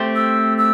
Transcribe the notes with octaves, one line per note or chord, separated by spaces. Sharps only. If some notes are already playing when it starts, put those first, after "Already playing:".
Already playing: A3 C4 G4 C5
E6
E6